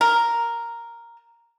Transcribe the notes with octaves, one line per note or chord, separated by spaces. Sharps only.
A#4